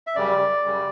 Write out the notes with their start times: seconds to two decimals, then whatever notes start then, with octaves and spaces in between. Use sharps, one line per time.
0.07 E5
0.15 F#2 C#3 G3 D5
0.65 F#2 C#3 G3